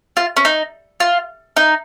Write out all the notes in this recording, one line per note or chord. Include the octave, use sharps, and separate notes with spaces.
F4
C#4
D#4
F4
D#4